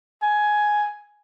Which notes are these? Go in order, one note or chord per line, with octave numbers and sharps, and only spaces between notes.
G#5